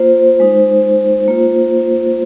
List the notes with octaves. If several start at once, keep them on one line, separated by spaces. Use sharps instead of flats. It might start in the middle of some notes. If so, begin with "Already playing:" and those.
Already playing: A#3 F4 C5
G#3 D#4
A#3 F4